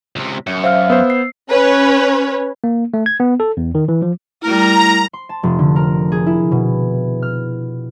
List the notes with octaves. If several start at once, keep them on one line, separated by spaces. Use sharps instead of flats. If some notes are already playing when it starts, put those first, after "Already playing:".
C#2 C3
F#2 C#7
C5 E5 F5 F6
B3 C5 E6
C7
C#4 B4 C#5
A#3
A3
G#6
B3
A4
E2
D#3
E3
F3
G3 A3 E4 A#4 A#5
C6
A5
F1
D3
A#4
G#4
E4
B2
F6